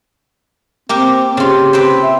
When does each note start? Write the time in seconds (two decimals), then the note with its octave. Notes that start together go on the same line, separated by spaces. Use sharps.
0.89 A#3 C4 G4 A#4
1.37 C#3 F4 G4
1.73 C4 B4 C5
2.03 E5